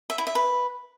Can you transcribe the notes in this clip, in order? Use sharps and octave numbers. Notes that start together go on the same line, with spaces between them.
E5
E4
E5
B4